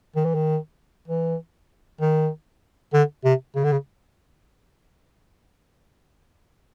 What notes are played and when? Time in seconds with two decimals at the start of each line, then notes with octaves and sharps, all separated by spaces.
0.16 D#3
0.25 E3
0.35 D#3
1.08 E3
2.01 D#3
2.93 D3
3.24 C3
3.55 C#3
3.64 D3
3.72 C#3